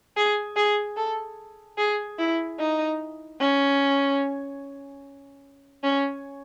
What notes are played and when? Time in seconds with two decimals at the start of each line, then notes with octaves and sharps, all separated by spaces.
0.17 G#4
0.56 G#4
0.97 A4
1.78 G#4
2.19 E4
2.59 D#4
3.40 C#4
5.84 C#4